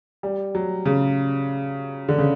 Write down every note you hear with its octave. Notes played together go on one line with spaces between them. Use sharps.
G3
F#3
C#3
D3
C#3